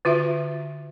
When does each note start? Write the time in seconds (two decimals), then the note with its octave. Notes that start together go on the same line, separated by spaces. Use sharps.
0.05 D3 F4 F#4 E5